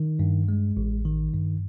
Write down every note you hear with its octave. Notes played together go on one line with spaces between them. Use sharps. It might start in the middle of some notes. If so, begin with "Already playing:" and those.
Already playing: D#3
G2
G#3
A1
D#3
G2